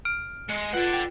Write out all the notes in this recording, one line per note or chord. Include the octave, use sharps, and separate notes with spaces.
F6 D7
G#3 C#7
F4 B4 D5 F#5
G5